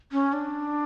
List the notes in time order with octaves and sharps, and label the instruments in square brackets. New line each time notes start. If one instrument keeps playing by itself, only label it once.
[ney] C#4
D4